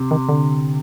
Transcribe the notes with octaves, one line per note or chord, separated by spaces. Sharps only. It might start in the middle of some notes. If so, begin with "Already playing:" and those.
Already playing: C3
D#3
D3